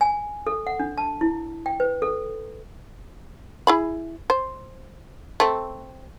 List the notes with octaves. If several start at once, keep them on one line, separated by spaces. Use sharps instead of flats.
G#5
A4
F#5
D4
A5
E4
G5
B4
A4
E4 G#4 B5
C5
A3 C4